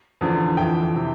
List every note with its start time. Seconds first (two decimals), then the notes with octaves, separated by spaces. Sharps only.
0.21 E2 D3 F3
0.57 F2 E3 E5 G5
0.96 C3 E3